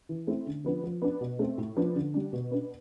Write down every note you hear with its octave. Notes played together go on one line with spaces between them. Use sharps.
E3
A3 C4 E4
D3
F3 B3 D4
F3
B3 D4
B2
A3 C4
A2
F3 B3 D4
D3
G3 D4
B2
B3 D4